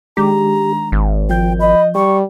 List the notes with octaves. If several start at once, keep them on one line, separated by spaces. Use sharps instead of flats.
D#3 G#3 D4 G4 A#5
G#1
F3 G5 G6
D#5 B5
G3 C#6